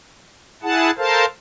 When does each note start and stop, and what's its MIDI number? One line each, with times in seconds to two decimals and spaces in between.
0.63 0.91 64
0.63 0.91 68
0.63 0.91 78
0.63 0.91 81
0.98 1.25 69
0.98 1.25 70
0.98 1.25 72
0.98 1.25 77
0.98 1.25 81